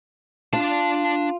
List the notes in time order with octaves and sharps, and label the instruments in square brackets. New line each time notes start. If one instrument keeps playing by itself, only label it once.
[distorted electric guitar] D4 A5 [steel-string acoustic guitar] F4